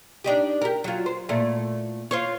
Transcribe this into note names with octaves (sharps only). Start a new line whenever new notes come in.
D4 D#4 G4
G4 A#4
F#3 F4
C5
A#2 A3 E4
F4 C5 C#5